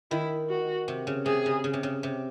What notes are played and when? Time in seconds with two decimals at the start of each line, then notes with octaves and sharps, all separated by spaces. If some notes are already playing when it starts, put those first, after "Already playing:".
0.11 D#3 E4
0.50 F#4
0.88 C3
1.07 C#3
1.26 C3 G#4
1.46 C#3
1.64 C#3
1.73 C3
1.83 C#3
2.03 C3